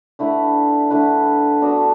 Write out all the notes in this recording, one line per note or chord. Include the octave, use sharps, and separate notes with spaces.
D3 A3 E4 B4
D3 A3 E4 B4
B3 D4 F#4